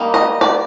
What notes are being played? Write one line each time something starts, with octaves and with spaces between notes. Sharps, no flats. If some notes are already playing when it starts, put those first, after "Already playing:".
Already playing: G3 A#3 D#4
D#5
D5